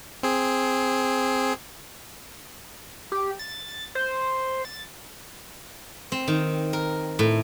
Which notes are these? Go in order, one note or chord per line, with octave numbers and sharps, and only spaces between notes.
C4 G#4
G4
A6
C5
A6
C4
D#3
A#4
A2